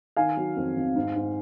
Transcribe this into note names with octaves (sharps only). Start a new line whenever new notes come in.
D#3 F5 G#5
F#3
F2
F2
G#2
G#2